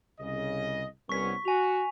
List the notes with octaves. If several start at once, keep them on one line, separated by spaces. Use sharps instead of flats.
C2 C#3 D#5
C2 B3 C#4 C#6 B6
F#4 G#5 F7